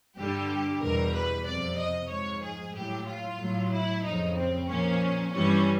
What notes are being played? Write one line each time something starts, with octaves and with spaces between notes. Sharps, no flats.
G2 D3 G3 G4
E2 B2 G3 A#4
B4
F2 C3 F3 D5
D#5
G#2 F3 C#5
G#4
A2 F#3 G4
F4
A2 F#3
E4
F2 C#3 F3 D#4
C4
A#2 F3 C#4
G2 E3 G3 C#4